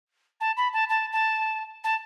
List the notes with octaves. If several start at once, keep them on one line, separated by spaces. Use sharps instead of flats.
A5
B5
A5
A5
A5
A5